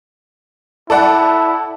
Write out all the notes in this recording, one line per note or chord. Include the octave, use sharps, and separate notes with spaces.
E4 A4 D5 F#5